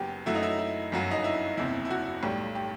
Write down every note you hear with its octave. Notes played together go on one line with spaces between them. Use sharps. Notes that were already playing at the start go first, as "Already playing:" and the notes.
Already playing: F#1 F#2 F#3 B3 G4
F#2 F#3 A3 E4
D#4
E4
E4
G1 F#2 F#3
D#4
E4
F#1 E2 C3 E4
E4
F#4
B1 A2 G3 G4
G4